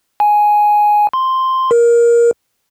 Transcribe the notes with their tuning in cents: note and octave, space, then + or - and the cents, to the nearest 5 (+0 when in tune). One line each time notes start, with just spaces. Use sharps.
G#5 +5
C6 +0
A#4 +15